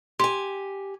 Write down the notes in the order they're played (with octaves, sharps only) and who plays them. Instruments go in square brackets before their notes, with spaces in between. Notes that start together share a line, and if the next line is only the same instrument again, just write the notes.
[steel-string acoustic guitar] G4 G#5 [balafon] C6